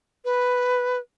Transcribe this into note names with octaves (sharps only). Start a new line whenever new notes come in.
B4